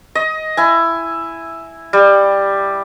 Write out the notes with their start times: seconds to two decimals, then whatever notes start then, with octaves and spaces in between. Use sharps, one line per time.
0.15 D#5
0.57 E4 G#5
1.93 G3